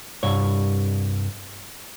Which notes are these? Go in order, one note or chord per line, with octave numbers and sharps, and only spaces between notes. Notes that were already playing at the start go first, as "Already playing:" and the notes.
C2 G2 C#5